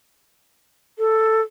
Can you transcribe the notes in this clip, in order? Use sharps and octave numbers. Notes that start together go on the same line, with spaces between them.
A4